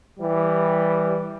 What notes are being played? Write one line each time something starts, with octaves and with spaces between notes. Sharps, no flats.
E3 G3